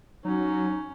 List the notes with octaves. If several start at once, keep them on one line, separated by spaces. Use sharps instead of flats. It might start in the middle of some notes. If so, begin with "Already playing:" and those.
F#3 C#4 D#4